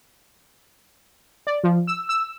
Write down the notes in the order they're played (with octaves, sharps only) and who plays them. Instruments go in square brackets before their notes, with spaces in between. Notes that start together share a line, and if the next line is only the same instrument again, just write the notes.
[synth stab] D5
F3
E6
E6